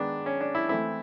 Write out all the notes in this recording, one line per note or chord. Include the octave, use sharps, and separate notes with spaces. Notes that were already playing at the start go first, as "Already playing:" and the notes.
Already playing: D#3 G#3 B3 D4
C#4
D4
E4
E3 A3 C4 E4